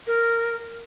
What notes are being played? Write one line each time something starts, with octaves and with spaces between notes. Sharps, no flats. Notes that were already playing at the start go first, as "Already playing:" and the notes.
A#4